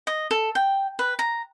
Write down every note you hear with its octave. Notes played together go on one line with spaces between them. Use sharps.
D#5
A4
G5
B4
A#5